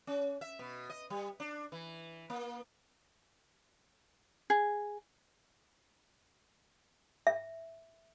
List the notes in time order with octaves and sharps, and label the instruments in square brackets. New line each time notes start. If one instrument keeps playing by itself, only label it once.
[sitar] C#4
E5
B2
D#5
G3
D4
E3
A#3
[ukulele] G#4
[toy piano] E5